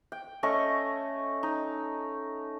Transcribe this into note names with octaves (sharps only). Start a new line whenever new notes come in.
G5
A3 C#4 D#5 C#6
D#4